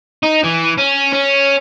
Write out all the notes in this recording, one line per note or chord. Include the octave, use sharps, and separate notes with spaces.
D#4
E3
C#4
C#4